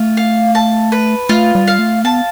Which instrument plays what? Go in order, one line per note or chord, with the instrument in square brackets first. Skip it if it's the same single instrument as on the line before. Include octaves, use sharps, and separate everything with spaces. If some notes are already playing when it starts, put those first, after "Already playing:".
Already playing: [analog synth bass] A3 [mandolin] F4
[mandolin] F5
A5
B4
[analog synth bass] A3 [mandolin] F4
[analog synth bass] G3
[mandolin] F5
[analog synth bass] A3
[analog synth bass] B3 [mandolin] A5